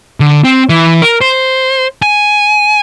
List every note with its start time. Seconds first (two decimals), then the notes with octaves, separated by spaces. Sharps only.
0.20 D3
0.44 C4
0.69 E3
1.02 A#4
1.21 C5
2.02 G#5